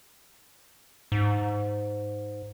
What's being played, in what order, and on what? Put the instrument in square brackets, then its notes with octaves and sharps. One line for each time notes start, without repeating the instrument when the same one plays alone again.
[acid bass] G#2